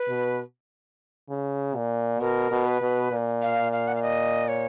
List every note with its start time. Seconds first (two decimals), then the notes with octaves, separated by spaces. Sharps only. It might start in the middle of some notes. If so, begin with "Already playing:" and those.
Already playing: B4
0.08 B2
1.29 C#3
1.76 A#2
2.20 B2 A#4
2.51 B2
2.66 B4
2.81 B2
3.12 A#2
3.42 F5
3.72 F5
3.88 F#5
3.96 F5
4.02 D#5
4.48 C#5